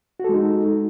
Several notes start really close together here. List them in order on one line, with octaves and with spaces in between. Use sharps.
F#4 A4 G#3 D#4